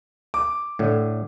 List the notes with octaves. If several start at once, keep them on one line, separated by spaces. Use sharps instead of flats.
D6
A2 D3